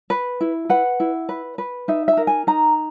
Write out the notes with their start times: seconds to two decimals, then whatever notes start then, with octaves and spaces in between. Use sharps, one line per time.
0.10 B4
0.41 E4
0.69 B4 F#5
1.00 E4
1.29 B4
1.58 B4
1.88 D#4 E5
2.08 E5
2.17 A#4
2.27 G#5
2.47 D#4 A#5